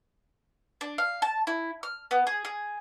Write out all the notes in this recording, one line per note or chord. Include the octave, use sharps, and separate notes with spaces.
D4
F5
A5
E4
F6
B3
G#4
G#4